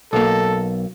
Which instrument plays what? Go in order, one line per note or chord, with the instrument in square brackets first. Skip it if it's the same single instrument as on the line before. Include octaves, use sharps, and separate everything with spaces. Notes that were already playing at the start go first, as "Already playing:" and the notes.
[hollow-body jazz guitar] B1 A#3 [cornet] A4